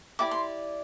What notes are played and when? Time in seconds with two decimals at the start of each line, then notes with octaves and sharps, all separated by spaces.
0.19 E4 G4 D5 D6
0.31 C6